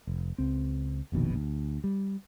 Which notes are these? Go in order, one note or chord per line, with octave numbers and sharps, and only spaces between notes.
F1
C#2 C4
F1 A#1 B2 D#3
D2
G3